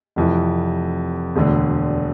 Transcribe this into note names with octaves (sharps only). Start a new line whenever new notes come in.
F1 F2 E3
E1 D2 D3